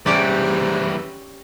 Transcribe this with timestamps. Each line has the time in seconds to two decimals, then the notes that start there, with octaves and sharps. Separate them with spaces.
0.06 G#2 E3 G3 C#4 G4 D5